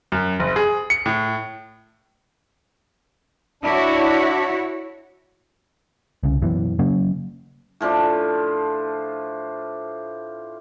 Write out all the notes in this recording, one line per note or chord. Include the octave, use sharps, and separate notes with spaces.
F#2
F#1
G#4
C#7
A2
D4 E4 F#4 C#5
C2 C#3
F#2 B2 E3
C#3 F#3 A#3 C#4
A2 F3 D4